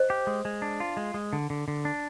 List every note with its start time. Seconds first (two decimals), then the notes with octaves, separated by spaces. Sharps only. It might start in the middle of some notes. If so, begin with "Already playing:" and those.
Already playing: C5 D#5
0.10 G4
0.27 G#3
0.45 G#3
0.62 D4
0.80 F4
0.97 G#3
1.14 G#3
1.33 D3
1.50 D3
1.68 D3
1.85 D4